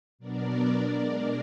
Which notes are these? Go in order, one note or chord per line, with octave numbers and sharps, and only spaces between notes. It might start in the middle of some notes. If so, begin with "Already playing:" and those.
B2 F#3 B3 D4 A#4 D5
B2 G#3 D4